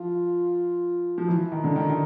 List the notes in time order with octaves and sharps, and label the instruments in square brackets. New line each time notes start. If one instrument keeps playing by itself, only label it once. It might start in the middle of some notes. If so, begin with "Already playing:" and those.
Already playing: [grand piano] F3 [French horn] F4
[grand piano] F3
E3
D#3
D3
D#3
D#3